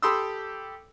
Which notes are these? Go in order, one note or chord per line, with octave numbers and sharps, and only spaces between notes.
G4 A4 B5 C6 D#6 E6